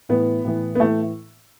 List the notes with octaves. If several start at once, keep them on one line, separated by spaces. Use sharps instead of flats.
A2 E3 B3
A2 E3
B3
A2 E3 A3